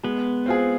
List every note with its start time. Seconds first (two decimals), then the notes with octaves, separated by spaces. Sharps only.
0.03 G#3 B3
0.46 C4 F4 G#4